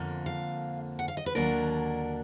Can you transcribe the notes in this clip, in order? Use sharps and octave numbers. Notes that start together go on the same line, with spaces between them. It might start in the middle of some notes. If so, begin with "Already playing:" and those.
Already playing: F2 D3 F3 A#3
F5
F#5
F5
D#5
B4
D#2 D3 F#3 A#3 D4 A#4